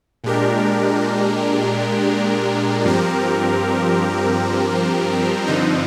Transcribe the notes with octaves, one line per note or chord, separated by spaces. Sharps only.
A#2 G#3 D4 G4 A#4
G2 F3 C4 G4 A#4
G2 D3 F3 C4 D#4